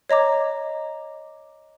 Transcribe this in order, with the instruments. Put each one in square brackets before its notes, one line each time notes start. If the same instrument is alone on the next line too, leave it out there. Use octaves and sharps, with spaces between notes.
[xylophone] C#5 D#5 A#5 D6